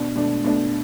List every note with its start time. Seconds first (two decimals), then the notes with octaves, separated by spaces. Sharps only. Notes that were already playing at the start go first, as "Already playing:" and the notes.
Already playing: B2 D4
0.15 B2 A3 D4
0.44 B2 A3 D4